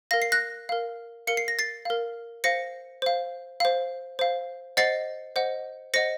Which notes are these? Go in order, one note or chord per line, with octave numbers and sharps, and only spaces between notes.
A#4 F5 A#6
C7
F#6 A#6
A#4 F5
A#4 F5 C#7
C7
A#6
A6 C7
A#4 F5
C5 F5 A#6 C#7
C5 F5
C5 F5
C5 F5
C5 D#5 F#5 A6 C7
C5 D#5 F#5
C5 D#5 F#5 A#6 C#7